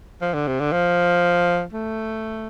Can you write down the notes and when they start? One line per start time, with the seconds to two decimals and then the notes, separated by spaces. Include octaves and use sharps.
0.22 F3
0.34 D3
0.47 C3
0.60 D3
0.72 F3
1.73 A3